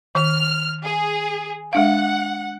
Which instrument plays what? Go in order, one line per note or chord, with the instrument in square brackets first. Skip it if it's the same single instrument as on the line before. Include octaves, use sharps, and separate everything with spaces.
[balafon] D#3 [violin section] F6
[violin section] G#4
[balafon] G#3 D4 F5 [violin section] F#5